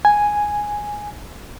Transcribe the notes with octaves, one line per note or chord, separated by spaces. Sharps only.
G#5